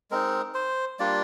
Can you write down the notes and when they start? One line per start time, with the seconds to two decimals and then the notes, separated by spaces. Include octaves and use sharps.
0.11 G#3 C4 D#4 A#4
0.54 C5
0.99 G3 A#3 D4 F4 D5